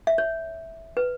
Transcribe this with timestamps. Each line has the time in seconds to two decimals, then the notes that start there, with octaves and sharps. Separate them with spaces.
0.07 E5
0.18 C#5
0.97 B4